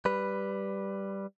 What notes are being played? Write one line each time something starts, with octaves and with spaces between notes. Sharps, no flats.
G3 B4